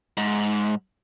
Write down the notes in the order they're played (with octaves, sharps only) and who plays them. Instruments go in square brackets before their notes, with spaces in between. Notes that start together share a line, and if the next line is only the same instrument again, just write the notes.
[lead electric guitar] G#2